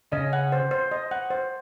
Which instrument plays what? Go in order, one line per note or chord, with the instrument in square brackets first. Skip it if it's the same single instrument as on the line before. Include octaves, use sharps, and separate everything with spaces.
[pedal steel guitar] C#3 C#4 [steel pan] D#5
[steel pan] F#5
C5
C5
D#5
F#5
C5